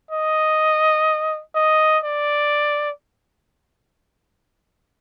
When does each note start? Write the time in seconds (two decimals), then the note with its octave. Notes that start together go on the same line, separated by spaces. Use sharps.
0.11 D#5
1.55 D#5
2.04 D5